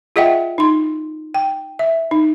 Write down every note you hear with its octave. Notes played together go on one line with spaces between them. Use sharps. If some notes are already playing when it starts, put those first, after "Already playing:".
F4 G#4 D#5 E5 F#5 G5
D#4 C6
G5
E5
D#4